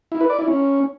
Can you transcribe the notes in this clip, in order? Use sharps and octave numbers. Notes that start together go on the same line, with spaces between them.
E4
B4
D5
E4
C#4